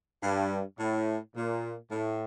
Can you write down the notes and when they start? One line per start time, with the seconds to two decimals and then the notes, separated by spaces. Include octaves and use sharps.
0.23 G2
0.79 A2
1.36 A#2
1.91 A2